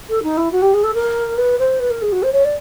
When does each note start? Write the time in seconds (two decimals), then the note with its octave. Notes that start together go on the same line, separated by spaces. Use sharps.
0.09 A4
0.22 D#4
0.37 E4
0.51 F#4
0.62 G4
0.73 G#4
0.83 A4
0.94 A#4
1.37 B4
1.58 C5
1.79 B4
1.90 A#4
2.01 G#4
2.12 F#4
2.22 C5
2.32 C#5
2.44 D5